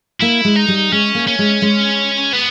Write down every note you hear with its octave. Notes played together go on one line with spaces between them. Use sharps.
A#3 E4
G#3
D#4
G3
G#3 C#4
A#3
C#4
G#3
G#3
B3